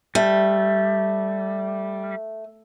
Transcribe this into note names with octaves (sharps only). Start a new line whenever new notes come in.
G3 A3